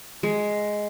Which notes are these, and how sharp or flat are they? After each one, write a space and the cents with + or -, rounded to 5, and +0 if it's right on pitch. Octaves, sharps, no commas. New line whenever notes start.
G#3 +5